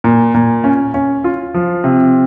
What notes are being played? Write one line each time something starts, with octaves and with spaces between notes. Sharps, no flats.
A#2
A#2
C#4
C#4
F4
F3
C3